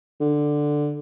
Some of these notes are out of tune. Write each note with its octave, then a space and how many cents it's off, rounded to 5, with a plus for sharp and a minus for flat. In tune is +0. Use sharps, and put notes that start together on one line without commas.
D3 +5